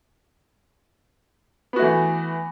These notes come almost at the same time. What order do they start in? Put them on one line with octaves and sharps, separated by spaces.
B3 F#4 A3 E3